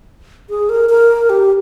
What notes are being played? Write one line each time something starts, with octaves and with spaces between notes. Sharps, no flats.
G#4
A#4
A#4
G4